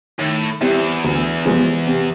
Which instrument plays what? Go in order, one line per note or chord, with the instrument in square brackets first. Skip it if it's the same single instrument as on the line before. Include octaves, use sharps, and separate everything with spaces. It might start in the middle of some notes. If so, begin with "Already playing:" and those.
[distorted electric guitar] A2 [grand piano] D#3
[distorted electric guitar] E2 [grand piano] G3 C4 E4
[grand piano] D2
C3 F3 G#3 B3
C3